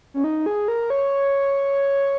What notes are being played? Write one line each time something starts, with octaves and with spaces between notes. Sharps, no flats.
C#4
D#4
G#4
A#4
C#5